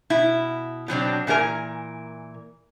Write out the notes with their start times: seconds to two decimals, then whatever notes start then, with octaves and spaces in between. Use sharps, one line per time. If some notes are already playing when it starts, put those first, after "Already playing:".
0.10 B2 E4
0.88 B2 F#3 C4 D4
1.27 A#2 E3 A4 A#4 G#5